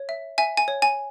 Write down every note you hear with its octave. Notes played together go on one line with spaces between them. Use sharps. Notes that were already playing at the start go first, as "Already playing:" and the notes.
Already playing: C#5
E5
E5 G#5
G#5
C#5
G#5